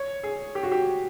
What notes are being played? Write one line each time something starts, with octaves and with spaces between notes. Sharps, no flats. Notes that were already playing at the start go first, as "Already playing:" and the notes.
Already playing: C#5
G#4
G4
F#4
G4